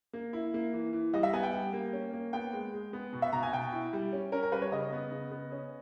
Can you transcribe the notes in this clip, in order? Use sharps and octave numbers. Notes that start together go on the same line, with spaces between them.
A#3
E4
A#3
E3
E3
G3 D#5
E5
B3 G#5
G5
G3
A#3
C#4
A#3
B3 G5
G#3
G#3
B3
B2
E5
B2 A#5
G#5
B2 G5
E4
G3
C#4
C#4 A#4
A#4
G3 B4
C#5
C#3 D#5
B3
C#3
B3
C#4